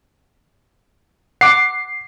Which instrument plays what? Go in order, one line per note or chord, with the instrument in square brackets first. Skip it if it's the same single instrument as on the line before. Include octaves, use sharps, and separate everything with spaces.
[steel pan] F#5 D6 [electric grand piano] C7